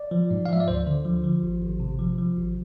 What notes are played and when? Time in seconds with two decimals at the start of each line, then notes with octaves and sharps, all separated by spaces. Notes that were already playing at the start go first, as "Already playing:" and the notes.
Already playing: D5
0.11 F3
0.31 G#2
0.46 F5
0.49 F3 E5
0.60 D5
0.68 D2 C5
0.87 D3
1.05 F3
1.24 F3
1.42 G#1
1.61 G#1
1.80 C3
1.99 F3
2.18 F3
2.36 G#1